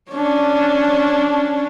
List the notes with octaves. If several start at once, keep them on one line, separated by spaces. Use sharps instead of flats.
C#4 D4